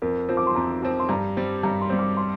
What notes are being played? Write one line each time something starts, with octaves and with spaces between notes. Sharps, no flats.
F2 A#4
F3 C4
D6
C6
F2 A#5
F3 C4
C6
G2 A#5
G3 C4
G2 A#5
C6
G3 C4
D6
C6